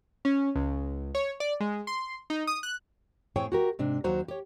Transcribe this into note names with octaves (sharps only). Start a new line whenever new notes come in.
C#4
C#2
C#5
D5
G#3
C6
D#4
D#6
F#6
A2 C4 G#4 C#5 G5
F#4 G4 A#4
G#2 C3 D4
D#2 F#3 F#4 C5 A#5
G4 C#5